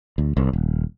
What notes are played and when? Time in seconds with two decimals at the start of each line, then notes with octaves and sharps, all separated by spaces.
0.18 D2
0.37 C2
0.53 D#1